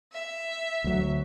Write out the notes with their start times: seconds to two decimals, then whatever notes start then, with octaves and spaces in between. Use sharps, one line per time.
0.13 E5
0.84 D2 F#3